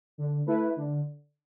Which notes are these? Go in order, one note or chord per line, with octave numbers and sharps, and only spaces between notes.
D3
A3 E4 B4
D3